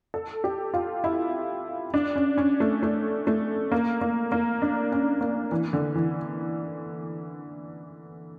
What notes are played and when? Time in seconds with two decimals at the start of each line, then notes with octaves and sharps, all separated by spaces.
0.14 A4
0.44 G4
0.74 F4
1.04 E4
1.94 D4
2.16 C#4
2.38 C#4
2.60 A3
2.83 A3
3.27 A3
3.72 A#3
4.01 A#3
4.32 A#3
4.62 D4
4.92 C#4
5.21 A#3
5.52 E3
5.73 D3
5.95 E3